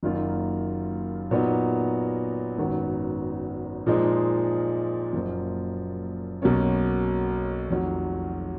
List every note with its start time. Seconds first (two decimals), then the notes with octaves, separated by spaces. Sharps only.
0.03 F#1 F#2 D#3 A#3 F4
1.31 A#2 F#3 B3 D#4
2.58 G#1 F#2 D#3 F#3 B3
3.86 A#2 F3 G#3 D#4
5.13 F#1 F#2 F3 A#3
6.42 B1 B2 A#3 C#4
7.69 F1 F2 D#3 F#3